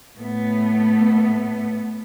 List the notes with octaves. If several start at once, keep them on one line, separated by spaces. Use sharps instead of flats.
A2 A3 B3